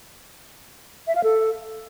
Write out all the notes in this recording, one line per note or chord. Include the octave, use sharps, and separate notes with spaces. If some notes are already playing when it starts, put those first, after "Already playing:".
E5
F5
A4